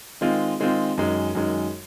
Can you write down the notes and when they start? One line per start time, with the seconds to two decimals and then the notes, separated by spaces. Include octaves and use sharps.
0.21 D#3 G#3 C4 F4
0.60 D#3 G#3 C4 F4
0.98 F#2 D#3 G#3
1.35 F#2 D#3 G#3